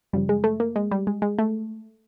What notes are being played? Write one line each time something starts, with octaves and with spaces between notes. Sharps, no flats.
F#2 C#3 F3 G3
G#3
A3
A#3
G#3
G3
G#3
G#3
A3